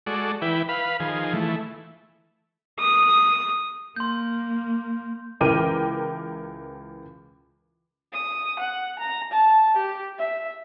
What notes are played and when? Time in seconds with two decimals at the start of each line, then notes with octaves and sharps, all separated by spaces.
0.07 G#3 F#4 A4 D5
0.42 E3 E4 B4 G5
0.69 B4 F5 B5
1.00 D#3 F3 G#4
1.33 E3 A3
2.79 D#6
3.96 A#3 C6 G6
5.41 C#2 E3 A#4 G5 D6 D#7
8.13 D#6
8.59 F#5
8.99 A#5
9.32 A5
9.77 G4
10.19 E5